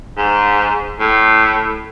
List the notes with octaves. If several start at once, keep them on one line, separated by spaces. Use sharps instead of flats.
G#2
A2